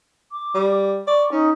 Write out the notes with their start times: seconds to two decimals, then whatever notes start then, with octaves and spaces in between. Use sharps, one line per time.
0.32 D6
0.55 G3
1.07 D5 C#6
1.32 C#4 D#4